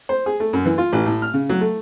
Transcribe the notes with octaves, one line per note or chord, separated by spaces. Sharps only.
C5
G#4
A3
F#2
E3
F4
A1
A2
F6
C#3
F#3
A3